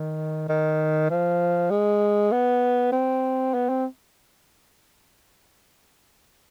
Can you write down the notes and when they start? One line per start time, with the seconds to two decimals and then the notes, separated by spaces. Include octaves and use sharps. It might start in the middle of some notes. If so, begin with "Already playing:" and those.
Already playing: D#3
0.48 D#3
1.10 F3
1.70 G#3
2.32 B3
2.92 C4
3.54 B3
3.69 C4